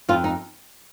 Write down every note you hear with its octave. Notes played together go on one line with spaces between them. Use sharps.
F2 F4
D#4